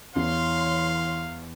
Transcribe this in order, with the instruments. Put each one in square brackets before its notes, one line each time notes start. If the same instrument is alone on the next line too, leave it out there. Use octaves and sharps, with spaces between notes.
[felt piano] E2 [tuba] E3 [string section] C#5 C6 [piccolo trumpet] F5